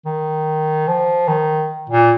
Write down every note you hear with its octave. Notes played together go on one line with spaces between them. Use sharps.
D#3
F3
D#3
A#2